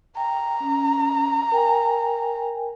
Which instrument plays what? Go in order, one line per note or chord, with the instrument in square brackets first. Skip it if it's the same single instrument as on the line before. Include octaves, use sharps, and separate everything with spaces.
[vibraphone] G5 [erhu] A#5
[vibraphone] C#4
A#4 G5 G#5